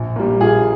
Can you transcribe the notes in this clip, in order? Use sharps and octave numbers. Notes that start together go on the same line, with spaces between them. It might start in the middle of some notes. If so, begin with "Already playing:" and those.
Already playing: A#1
A#2 G3
A#1 F4 G#4